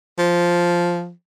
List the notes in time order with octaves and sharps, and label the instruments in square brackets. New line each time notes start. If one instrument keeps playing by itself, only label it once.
[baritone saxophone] F3